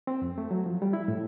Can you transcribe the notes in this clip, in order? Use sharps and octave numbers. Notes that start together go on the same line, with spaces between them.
C4
F2
A3
F#3
F3
G3
E4
A2